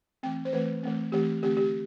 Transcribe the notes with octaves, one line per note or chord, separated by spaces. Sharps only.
E3 A3 C4 G5
C5
E3 A3 C4 B4
E3 A3 C4
E3 A3 C4 G4
D3 A3 C4 G4
G4